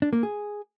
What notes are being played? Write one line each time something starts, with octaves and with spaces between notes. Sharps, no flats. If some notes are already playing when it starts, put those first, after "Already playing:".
D4
A#3
G#4